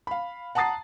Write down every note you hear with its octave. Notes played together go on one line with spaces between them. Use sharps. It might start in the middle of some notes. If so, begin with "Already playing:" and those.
F5 B5
F#5 A5 A#5 D#6 A6 C7